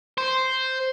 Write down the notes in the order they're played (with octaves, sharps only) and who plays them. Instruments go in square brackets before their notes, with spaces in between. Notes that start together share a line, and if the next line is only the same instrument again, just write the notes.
[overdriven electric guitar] C5